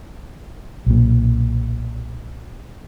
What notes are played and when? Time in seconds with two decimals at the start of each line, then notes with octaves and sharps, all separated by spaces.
0.86 B1 A#2